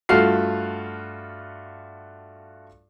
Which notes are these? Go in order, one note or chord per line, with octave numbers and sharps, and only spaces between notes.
G2 A3 F4 F#4 F6 C7